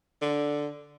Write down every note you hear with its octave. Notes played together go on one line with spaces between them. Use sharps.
D3